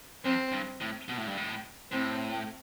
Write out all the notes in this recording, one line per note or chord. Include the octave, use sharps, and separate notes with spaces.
F2 C4
G2
A2
B2
A2
G2
A2
A2 C4